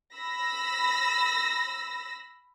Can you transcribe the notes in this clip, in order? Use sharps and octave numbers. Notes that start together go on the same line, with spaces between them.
B5 E6 A#6